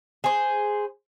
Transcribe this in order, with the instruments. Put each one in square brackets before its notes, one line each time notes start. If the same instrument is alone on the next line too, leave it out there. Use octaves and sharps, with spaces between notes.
[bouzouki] G#4 C5